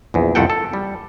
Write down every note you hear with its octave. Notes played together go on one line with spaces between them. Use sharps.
A#1 E2
C2 F2 A3 A4 F#5 G5
A4
G3